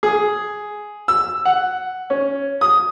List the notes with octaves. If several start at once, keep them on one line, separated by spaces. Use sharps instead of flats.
G#4
E6
F#5
C#4
D#6